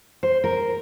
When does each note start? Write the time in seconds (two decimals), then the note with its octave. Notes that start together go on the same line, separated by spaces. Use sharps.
0.23 C5
0.44 A#4